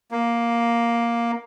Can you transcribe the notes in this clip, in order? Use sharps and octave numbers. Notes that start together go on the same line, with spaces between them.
A#3